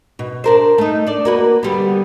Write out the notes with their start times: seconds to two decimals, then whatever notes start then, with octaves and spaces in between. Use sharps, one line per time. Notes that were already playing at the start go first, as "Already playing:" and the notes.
0.19 B2
0.44 D4 A#4 C5
0.78 A3 D#4
1.07 D4 D5
1.25 A#3 F#4 B4
1.63 D3 G3 B3